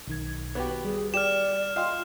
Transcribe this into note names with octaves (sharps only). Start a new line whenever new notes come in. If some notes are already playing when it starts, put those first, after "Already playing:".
B1 D#3 G#6
B3 F#4 G4
G3 G#4
G4 D5 F6 E7
F4 D#5 F5 G5 C6